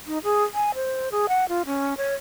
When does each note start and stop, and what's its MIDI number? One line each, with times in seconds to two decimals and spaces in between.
0.07 0.18 63
0.24 0.43 68
0.54 0.71 80
0.75 1.09 72
1.12 1.26 68
1.29 1.48 78
1.49 1.63 65
1.66 1.94 61
1.98 2.14 73